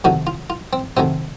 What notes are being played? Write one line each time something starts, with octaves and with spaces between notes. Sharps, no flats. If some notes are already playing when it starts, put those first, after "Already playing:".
C3 D#3 F#3 A3 F#4
F4
F4
C4
C3 D#3 F#3 A3 C4